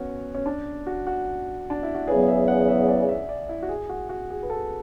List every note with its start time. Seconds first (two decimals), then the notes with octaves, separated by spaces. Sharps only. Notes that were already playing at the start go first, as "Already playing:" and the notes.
Already playing: B3 C#4 F#4
0.35 C#4
0.46 D4
0.87 F#4
1.07 F#4
1.70 D4
1.83 E4
1.95 F#4
2.07 E2 C#3 F#3 B3 G#4
2.28 E5
2.48 F#5
2.68 E5
2.88 D5
3.09 E5
3.29 D5
3.49 E4
3.63 F#4
3.69 G#4
3.89 F#4
4.09 F#4
4.30 G#4
4.43 B4
4.50 A4